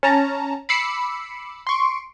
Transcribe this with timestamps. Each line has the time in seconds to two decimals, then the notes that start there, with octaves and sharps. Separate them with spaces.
0.03 C#4 A5 A#5
0.69 B5 D6 E6 C7 C#7
1.67 C6 C#6 D7